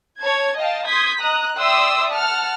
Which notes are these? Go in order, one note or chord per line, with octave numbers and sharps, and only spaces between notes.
C#5 A5 G#6
D#5 F5 G5 A5
C6 D#6 G6 G#6 B6
D#5 A#5 D#6 F#6
D5 E5 G5 C6 D#6 E6
F#5 A5 F6